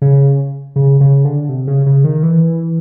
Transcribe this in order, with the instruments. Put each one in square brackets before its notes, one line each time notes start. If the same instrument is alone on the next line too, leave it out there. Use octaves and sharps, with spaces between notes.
[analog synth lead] C#3
C#3
C#3
D3
C3
C#3
C#3
D#3
E3